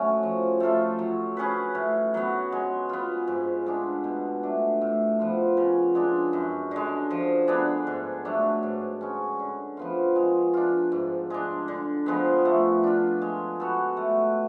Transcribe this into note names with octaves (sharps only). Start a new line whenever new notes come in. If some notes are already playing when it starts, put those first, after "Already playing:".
Already playing: F#3 A3 C#4
F3
A3 F4 A4
F#3
C#4 G#4 B4
A2
F#3 B3
G#3
B3 F4
G#2
G#3 D4
B2
A3 D4
A2
F3 B3 F4
C#3
G#3 D4
F#2
D3 G#3
F3
B3 D4 G#4
G#2
F#3 A3 D4
G#2
G#3 C#4
D3
F3 B3 F4
G#3
D4 F4
G#2
G#3 D4
D3
F3 G#3 B3
A3
D4 F4
G#3
B3 F#4 A4
A3